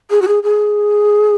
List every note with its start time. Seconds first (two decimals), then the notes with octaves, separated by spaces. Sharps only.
0.10 G#4
0.22 F#4
0.28 G#4
0.43 G#4